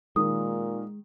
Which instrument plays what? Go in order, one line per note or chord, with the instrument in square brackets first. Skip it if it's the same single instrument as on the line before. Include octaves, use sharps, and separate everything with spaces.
[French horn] A#2 [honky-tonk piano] D#3 [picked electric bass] G#3 [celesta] D#6